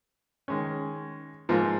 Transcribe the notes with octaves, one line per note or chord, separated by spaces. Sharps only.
D#3 G#3 C#4
G#2 F3 A#3 F4